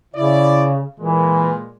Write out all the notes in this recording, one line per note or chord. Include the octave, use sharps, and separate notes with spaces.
C#3 E4 D5
A#2 E3 G#3